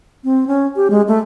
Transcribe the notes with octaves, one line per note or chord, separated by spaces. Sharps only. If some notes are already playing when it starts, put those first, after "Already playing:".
C4
C#4
G4
G#3
A3